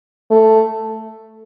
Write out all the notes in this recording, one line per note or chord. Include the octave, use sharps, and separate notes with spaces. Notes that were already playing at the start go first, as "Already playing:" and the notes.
A3